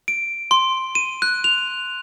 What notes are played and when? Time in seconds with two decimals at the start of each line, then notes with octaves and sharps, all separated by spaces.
0.08 D7
0.51 C6
0.95 D#7
1.22 F#6
1.44 F7